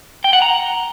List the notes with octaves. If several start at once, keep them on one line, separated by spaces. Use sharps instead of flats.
G5
F#5
A#5